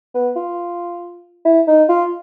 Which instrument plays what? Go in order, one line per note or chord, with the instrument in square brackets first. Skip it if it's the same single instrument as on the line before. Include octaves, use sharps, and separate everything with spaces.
[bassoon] B3
F4
E4
D#4
F4